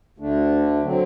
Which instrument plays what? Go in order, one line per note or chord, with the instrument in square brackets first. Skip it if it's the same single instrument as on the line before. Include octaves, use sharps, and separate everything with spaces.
[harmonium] D2 D3 A3 D4
D3 F#3 C4